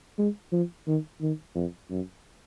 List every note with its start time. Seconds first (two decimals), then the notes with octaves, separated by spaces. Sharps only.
0.18 G#3
0.52 F3
0.87 D#3
1.21 D#3
1.55 F2
1.90 F#2